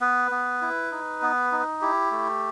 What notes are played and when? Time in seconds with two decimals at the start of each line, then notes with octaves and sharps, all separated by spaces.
0.01 B3 B4
0.31 B3
0.62 E4
0.92 D#4
1.22 B3
1.52 D#4
1.81 E4 G4
2.11 A3